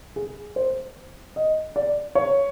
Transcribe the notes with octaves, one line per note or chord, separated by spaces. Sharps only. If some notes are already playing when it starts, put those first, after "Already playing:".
G#4
C5
D#5
D5
C#5